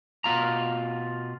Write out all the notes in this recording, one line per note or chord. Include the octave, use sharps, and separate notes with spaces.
B2 F4 A#5